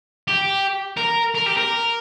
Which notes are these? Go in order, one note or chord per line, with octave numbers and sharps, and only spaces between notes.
G4
A#4
A#4
G4
A#4